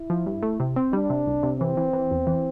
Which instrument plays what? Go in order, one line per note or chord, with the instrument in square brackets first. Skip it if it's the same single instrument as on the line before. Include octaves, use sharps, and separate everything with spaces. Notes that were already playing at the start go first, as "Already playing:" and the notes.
Already playing: [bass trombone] E4
[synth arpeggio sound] F3
G2
A3
C3
C4
[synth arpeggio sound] G3 [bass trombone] D4
[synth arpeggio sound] C3
C2
C3
[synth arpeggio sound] E3 [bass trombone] C4
[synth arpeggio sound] E3
E3
E2
E3